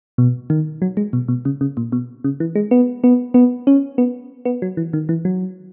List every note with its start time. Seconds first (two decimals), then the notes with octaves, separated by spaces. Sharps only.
0.18 B2
0.50 D#3
0.82 F#3
0.97 G#3
1.13 B2
1.28 B2
1.45 C#3
1.61 C#3
1.77 A#2
1.92 B2
2.24 C#3
2.40 E3
2.55 G#3
2.71 B3
3.04 B3
3.34 B3
3.67 C#4
3.98 B3
4.45 B3
4.62 F#3
4.77 E3
4.93 D#3
5.09 E3
5.25 F#3